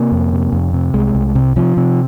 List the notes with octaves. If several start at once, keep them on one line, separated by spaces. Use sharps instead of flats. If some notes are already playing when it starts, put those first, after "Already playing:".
Already playing: C3 A#3
F2
C3
F2
C3
C2 G#3
C2
C3
C3 F3
C3